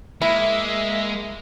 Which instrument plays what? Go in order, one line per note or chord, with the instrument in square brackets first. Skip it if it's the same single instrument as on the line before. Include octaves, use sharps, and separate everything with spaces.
[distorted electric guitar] G#3 [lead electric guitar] A#3 [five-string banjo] E4 [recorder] E5